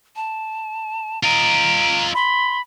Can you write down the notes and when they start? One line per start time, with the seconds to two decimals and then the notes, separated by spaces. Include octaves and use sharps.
0.16 A5
1.23 F4 D#5 A#5 D7
2.14 B5 C6